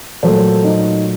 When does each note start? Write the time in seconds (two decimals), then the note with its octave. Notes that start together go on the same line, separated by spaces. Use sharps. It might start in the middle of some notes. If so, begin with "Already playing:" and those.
0.23 A#2 F#3 A3 A4 C5
0.64 D#4